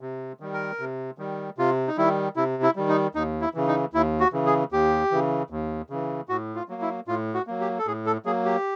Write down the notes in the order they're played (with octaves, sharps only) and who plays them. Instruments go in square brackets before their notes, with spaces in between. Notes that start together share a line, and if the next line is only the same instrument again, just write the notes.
[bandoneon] C3
D#3 G3
A#4
C3
D#3 G3
C3 F4
D#4
D#3 G3 E4
C3 E4
E4
D#3 G3
D#4
D#2 D#4
E4
C#3 E3
D#4
D#2 E4
F#4
C#3 E3
G#4
D#2 G4
C#3 E3
D#2
C#3 E3
A2 F#4
F4
F#3 A#3
E4
A2 F4
F#4
F#3 A#3
G4
A4
A2 G#4
A4
F#3 A#3 G#4
G4